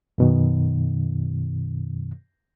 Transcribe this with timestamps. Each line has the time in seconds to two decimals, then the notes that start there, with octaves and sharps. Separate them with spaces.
0.18 F#2 B2 D#3